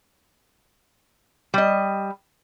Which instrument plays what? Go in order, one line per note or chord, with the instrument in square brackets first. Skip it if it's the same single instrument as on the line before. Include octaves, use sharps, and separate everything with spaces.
[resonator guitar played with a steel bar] G3 D#5